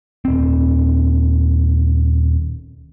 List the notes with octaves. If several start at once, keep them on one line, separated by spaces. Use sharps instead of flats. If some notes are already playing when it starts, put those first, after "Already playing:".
D#1 C4